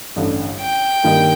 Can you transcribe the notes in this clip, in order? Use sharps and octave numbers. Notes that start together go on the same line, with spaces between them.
A1 G2 D3
G5
G2 D#3 G3 A#3 D#4